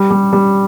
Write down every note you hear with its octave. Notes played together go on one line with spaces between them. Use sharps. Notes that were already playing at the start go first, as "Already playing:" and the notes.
Already playing: G3
G3
G3